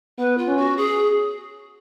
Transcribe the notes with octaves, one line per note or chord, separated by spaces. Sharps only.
B3 B4
F4
C#4
F#4
G#4